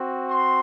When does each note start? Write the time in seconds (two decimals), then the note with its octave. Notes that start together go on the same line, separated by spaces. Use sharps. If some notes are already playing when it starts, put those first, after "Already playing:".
Already playing: C4 F#4
0.29 C6